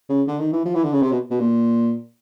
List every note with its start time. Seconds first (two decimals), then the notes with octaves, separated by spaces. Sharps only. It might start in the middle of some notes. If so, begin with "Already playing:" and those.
0.09 C#3
0.27 D3
0.40 D#3
0.52 E3
0.65 F3
0.75 E3
0.84 D3
0.93 C#3
1.02 C3
1.12 B2
1.31 B2
1.40 A#2